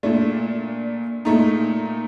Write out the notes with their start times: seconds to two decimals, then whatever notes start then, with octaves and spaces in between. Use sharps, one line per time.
0.03 A#2 A3 D4
1.25 A#2 A3 D#4